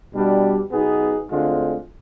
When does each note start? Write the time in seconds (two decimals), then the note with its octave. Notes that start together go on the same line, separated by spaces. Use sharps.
0.13 B2 G3 D4 G4
0.71 B1 B2 B3 D#4 G#4
1.29 D2 D3 G#3 C4 F4